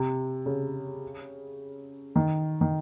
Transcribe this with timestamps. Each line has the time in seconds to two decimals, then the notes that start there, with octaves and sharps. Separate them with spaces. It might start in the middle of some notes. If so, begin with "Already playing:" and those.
Already playing: C3
0.46 C#3
2.16 D#3
2.61 D#3